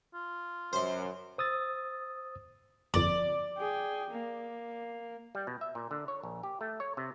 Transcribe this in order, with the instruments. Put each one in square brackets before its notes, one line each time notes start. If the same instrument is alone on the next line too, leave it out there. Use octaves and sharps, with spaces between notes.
[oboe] F4
[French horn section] F#2 [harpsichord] C5 C6
[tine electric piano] C5 D#6 E6 A6
[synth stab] G1 F2 [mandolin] D5
[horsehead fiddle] G#4 G5
A#3
[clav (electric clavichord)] G3
B2
E5
A#2
D3
C#5
A#1
G4
A3
C#5
C3